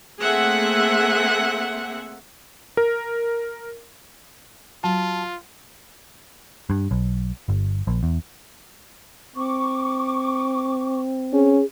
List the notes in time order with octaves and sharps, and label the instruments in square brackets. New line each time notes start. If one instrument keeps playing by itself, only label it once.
[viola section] A3 A#3 C4 G#4 E5 F#5
[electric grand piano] A#4
[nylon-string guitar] F#3 [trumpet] F4 [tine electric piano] A5
[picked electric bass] G2
B1
G1
A#1
E2
[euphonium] C4 [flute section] C#6 D6
[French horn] C#4 [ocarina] G#4